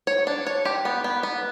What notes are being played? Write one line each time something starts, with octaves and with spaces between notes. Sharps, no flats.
C#5
D4
C#5
G4
B3
B3
B3